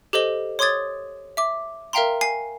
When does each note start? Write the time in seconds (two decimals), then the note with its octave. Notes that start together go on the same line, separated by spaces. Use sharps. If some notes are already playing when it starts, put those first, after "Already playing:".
0.13 G4 A4 C5 D#5 G7
0.59 C#5 C6 D6 D#6 G#6 A6
1.37 E5 D6
1.93 A#4 E5 F5 G5 A#5 C6
2.21 G#5 C7